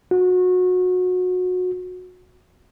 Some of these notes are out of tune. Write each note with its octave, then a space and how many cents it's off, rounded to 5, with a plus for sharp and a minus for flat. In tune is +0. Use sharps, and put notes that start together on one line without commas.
F#4 -25